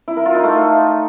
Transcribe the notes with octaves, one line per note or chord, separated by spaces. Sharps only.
E4
A#4
F4
D#4
A3